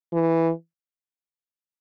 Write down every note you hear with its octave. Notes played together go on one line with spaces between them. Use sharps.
E3